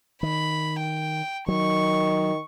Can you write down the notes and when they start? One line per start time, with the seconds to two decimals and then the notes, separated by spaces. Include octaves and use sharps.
0.23 D#3 B5
0.80 G5
1.48 D#3 F#3 C#6